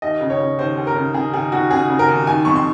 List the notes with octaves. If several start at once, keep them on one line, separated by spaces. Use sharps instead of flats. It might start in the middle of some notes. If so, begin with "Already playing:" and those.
D#2 D#5
C#3
C#5
C#3
D#2 C5
D#2
A#4
C#3
C#3 G#4
D#2 G#4
D#2 F#4
C#3 G#4
C#3
A#4
D#2
D#3 G#5
F2 C#6
C6